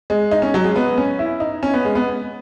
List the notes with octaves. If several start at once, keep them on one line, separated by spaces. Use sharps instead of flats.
G#3
D#4
C#4
F#3
G#3
B3
C#4
E4
D#4
C#4
B3
G#3
B3